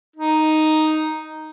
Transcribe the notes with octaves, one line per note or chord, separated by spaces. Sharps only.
D#4